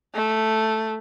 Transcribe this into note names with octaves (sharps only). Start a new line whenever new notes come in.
A3